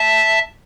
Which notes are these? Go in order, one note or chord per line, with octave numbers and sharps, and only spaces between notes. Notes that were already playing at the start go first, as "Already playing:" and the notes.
Already playing: E5 A5